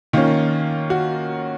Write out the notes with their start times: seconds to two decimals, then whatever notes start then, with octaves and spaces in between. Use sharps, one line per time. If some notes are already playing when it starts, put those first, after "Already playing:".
0.13 D#3 A#3 C#4 F4
0.90 F#4